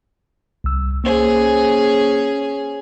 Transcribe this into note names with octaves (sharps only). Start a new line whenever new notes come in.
C2 E6
A#3 C#4 G#4 C5